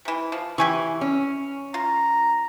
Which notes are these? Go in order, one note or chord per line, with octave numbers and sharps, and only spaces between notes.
C3 E3
F3
E3 G4 G#5 C#6
C#4
F4 A#5